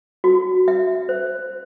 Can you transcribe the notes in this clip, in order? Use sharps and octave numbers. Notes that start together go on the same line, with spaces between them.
F#4
E5
C5